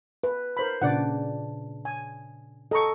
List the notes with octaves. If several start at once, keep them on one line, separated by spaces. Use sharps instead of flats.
B4
A#4 C5 B5
A#2 C#3 D4 D5 F#5
G#5
A4 D#5 A#5 C#6